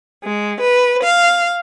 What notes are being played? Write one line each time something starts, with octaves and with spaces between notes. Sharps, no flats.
G#3
B4
F5